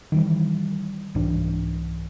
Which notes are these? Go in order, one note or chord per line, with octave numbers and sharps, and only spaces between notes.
D#3 E3 G3
C2 G#2 E3 D4